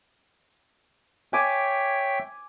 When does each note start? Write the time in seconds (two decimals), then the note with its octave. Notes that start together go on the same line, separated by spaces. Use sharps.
1.33 C#5 E5 G5 G#5 D6